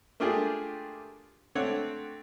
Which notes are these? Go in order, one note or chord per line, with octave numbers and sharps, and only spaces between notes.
A3 A#3 D4 F4 G4 G#4
A3 C4 D4 C#5 F#5